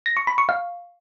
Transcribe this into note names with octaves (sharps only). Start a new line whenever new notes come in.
A#6
C#6
B5
C#6
F5